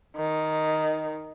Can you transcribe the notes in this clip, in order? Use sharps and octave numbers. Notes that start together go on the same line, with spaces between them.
D#3